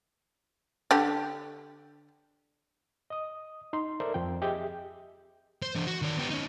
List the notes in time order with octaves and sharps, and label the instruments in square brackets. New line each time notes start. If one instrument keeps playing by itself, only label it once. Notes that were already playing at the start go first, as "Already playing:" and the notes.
[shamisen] D3 G4
[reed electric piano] D#5 D#6
D#4 C6
A4 A#4 C5 D5 E5
F2 F3 C4 G5
G4 G#4 D#5 E5 G5
[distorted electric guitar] C5
E3 D4
F#4
D#3 D5
B3 G4
C#4 D#4